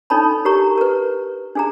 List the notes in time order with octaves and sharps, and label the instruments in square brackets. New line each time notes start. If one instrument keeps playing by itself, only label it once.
[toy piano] D4 D#4 A4 C#5 A5 B5
G4 A#4 C#5 A#5 C#6
A#4 B4
D4 G#4 A#5